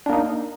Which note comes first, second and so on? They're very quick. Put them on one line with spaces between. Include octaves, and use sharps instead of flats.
D4 A#3 D#4